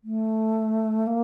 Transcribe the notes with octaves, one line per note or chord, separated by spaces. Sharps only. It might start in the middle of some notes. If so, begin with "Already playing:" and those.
A3
A#3